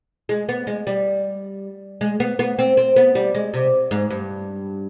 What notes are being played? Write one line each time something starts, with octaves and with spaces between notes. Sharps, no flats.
G#3
B3
G#3
G3
G#3
B3
B3
C4
C4
B3
G3
G#3
C3
G#2
G2